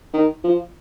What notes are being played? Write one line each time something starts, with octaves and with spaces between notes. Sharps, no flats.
D#3
F3